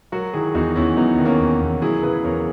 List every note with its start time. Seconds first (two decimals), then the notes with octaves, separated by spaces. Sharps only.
0.12 F#3 F#4 A#4
0.34 D#3 E4 G#4
0.54 E2 D#4 F#4
0.76 E2 C#4 E4
0.97 F#3 B3 D#4
1.18 D#3
1.25 A#3 C#4
1.40 E2
1.61 E2
1.82 F#3 E4 G#4
2.03 C#3 G#4 B4
2.24 E2 A#4 C#5